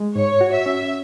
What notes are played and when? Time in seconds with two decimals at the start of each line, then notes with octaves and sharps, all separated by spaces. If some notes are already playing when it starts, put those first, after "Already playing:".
Already playing: G#3
0.16 G#2 C#5
0.41 F#4
0.53 E5
0.66 C#4